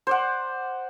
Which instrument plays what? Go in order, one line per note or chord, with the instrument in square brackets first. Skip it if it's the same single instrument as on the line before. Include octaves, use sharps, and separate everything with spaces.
[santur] C5 D5 F#5